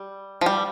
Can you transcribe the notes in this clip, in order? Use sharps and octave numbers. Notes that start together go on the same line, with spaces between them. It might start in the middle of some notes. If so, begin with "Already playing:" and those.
Already playing: G3
F3
G3